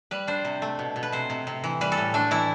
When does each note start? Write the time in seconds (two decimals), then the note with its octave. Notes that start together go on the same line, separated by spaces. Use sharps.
0.11 G3 B4
0.27 D4 C5
0.45 C3
0.62 A3
0.79 B2
0.96 B2
1.03 B4
1.12 C3 C5
1.30 C3
1.47 C3
1.64 E3
1.81 G3 B4
1.92 A4
1.97 A2
2.14 A3 D4
2.31 E3 E4